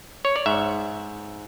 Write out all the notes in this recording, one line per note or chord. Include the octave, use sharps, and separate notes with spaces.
C#5
D5
G#2 E5